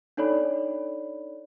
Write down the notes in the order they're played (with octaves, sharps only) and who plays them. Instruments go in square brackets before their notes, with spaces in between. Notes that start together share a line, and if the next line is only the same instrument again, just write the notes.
[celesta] D4 D#4 A4 C#5 D5 B5